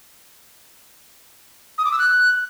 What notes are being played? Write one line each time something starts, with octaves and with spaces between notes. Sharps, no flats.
D#6
D6
E6
F#6